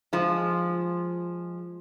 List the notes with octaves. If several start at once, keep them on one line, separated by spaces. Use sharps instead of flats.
F3 G#3